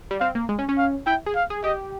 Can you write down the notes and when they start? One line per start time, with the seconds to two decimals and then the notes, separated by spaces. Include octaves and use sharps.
0.11 G3
0.20 C4 F5
0.35 A#3
0.49 G#3
0.59 C#4
0.69 C#4
0.78 F5
1.07 E4 G5
1.26 G#4
1.35 F5
1.50 G#4
1.64 G4 D#5